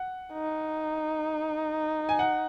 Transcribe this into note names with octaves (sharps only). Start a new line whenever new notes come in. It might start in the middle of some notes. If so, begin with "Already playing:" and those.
Already playing: F#5
D#4
G#5
F#5